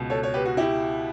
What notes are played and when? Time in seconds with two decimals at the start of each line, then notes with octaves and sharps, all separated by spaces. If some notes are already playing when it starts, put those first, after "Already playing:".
Already playing: C#2 B2
0.10 A4 C#5
0.23 C#5
0.34 G4 B4
0.45 F#4
0.57 E4 G4